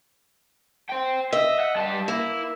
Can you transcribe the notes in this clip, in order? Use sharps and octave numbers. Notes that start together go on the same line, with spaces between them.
C5 G5
D#5 E5
F#5
G3 A5
A#3 E4